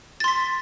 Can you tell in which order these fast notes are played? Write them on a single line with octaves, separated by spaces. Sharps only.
A6 C6 B6